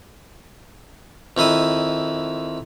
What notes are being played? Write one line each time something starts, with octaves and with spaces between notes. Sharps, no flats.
F2 D#3 E4 D#6